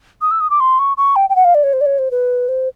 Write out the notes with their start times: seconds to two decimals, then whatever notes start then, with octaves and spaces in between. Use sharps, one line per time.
0.21 D#6
0.31 E6
0.41 D#6
0.50 D6
0.60 C6
0.79 C#6
0.97 C#6
1.16 G5
1.30 G5
1.36 F#5
1.45 F5
1.55 D5
1.64 C#5
1.73 C5
1.81 D5
1.86 C#5
1.99 C5
2.11 B4
2.49 C5